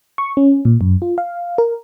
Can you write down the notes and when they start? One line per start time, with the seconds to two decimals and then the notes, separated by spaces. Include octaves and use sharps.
0.18 C#6
0.37 C#4
0.65 A#2
0.81 F#2
1.02 F4
1.18 F5
1.58 A#4